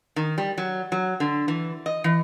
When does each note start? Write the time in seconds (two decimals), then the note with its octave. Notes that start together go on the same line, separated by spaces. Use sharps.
0.16 D#3
0.38 G3
0.58 F#3
0.92 F#3
1.20 D3
1.48 E3
1.86 D#5
2.04 E3